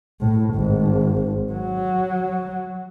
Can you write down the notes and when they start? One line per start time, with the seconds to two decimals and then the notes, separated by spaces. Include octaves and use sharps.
0.21 A2
0.55 G#1
1.53 F#3